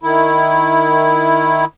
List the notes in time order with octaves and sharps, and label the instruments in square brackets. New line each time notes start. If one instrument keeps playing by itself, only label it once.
[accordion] D#3 E4